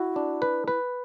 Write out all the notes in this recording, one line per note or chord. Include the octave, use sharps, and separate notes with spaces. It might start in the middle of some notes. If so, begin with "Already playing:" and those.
Already playing: E4 F#4
D4
B4
B4